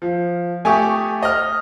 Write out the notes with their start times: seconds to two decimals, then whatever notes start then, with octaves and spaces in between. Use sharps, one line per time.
0.02 F3
0.65 A3 G4 G#5 C#6 D#6
1.23 D#5 F6